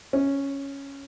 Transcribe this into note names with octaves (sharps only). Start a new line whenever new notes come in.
C#4